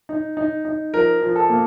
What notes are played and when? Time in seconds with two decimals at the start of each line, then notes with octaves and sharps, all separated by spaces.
0.09 D#4
0.37 D#4
0.65 D#4
0.94 F3 A#4
1.22 F3
1.36 A4
1.50 A#3